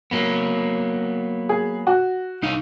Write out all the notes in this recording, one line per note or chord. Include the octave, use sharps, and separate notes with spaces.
F#3 A#3 B3
G#4
F#4
C2 D#4 F5